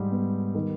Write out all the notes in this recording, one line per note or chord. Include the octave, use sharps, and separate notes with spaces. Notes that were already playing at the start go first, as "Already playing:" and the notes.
Already playing: G#2 G3
B3
D#3